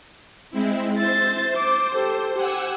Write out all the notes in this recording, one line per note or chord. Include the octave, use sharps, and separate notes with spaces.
G#3 C4 E4
C5 E5 A6
D6
G4 A4
G4 F#5 G#5 E6